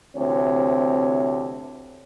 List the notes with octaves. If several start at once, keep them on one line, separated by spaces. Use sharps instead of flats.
D2 C3 E3 C4 C#5